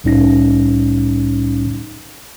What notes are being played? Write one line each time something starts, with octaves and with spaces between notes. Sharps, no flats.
C2 A2 G3 C#4 D#4 A#6